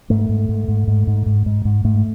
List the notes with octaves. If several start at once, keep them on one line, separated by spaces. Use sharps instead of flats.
G#2 A3
G#2
G#2
G#2
G#2
G#2
G#2
G#2
G#2
G#2 A3